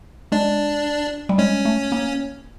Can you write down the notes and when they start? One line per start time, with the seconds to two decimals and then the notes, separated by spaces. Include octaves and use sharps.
0.32 G#3 D4
1.29 G3
1.38 G#3 C#4
1.65 A3
1.92 A#3